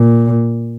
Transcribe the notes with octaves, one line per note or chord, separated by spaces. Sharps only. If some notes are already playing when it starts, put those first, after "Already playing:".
Already playing: A#2